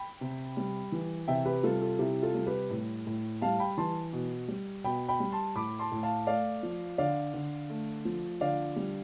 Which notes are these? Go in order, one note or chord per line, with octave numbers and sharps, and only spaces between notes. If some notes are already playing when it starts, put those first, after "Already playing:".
Already playing: G5 B5
C3
G3
E3
C3 E5 G5
G4 B4
G3 F4 A4
F4 A4
C3 E4 G4
F4 A4
G3
G4 B4
A2
A2
G3 F5 A5
G5 B5
E3 A5 C6
B2
G3
B2 G5 B5
G5 B5
G3
A5 C6
A2 B5 D6
A5 C6
A2
F5 A5
A3 D5 F5
F3
D3 D5 F5
D3
A3
F3
D3 D5 F5
G3